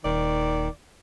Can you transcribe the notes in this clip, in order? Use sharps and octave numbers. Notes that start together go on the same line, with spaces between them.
D#1 D#3 D5